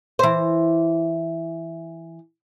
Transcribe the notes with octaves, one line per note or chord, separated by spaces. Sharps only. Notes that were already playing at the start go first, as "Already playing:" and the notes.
E3 C5